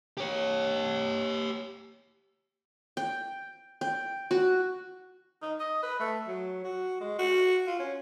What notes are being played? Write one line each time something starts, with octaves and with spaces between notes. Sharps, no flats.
G4 C#5
G5
G5
F#4
D#4
D#5
B4
A3
F#3
F#4
G#3
F#4
F4
C#4